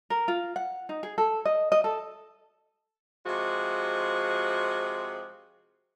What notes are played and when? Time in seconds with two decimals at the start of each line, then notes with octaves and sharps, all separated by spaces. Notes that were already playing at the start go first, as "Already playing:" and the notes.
0.10 A#4
0.28 F4
0.56 F#5
0.89 D#4
1.03 G#4
1.18 A4
1.45 D#5
1.72 D#5
1.84 A4
3.26 C3 F3 G#3 F#4